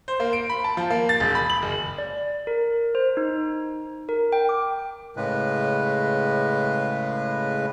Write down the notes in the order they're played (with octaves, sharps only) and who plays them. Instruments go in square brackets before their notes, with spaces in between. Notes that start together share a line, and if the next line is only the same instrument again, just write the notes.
[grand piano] C5
A#3
D7
B5
A5
F3
A#3
A6
E1
B5
F#7
F#1
[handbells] D5
A#4
C5
D#4
A#4
G5
D6
[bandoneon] A2 C#3 G#3 B4